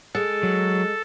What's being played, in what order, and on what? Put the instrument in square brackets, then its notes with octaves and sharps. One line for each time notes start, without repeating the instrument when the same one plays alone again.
[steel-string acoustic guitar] G#3 [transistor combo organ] A4
[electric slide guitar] F#3